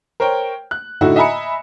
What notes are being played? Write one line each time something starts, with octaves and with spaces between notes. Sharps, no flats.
A#4 C5 C#5 G5
F#6
A2 D3 A3 D#4 E4 F#4
D#5 E5 G#5 A#5 B5 C#7